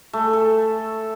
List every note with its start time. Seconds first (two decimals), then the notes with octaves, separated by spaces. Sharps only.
0.13 A3
0.33 A4